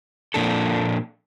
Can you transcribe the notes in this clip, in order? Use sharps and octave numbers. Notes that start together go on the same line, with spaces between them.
A#2 F3 A#3 D4 A4